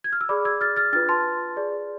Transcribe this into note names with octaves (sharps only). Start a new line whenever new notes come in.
G#6
F6
E6
G#4 D5 B5 D6
E6 G#6
F6 A6
F6 A6
D4 F4 B4 F6 A6
A5 C6
G#4 D5